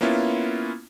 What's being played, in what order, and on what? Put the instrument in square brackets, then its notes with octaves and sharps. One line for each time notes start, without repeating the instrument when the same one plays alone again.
[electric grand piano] A#3 B3 C#4 E4 F4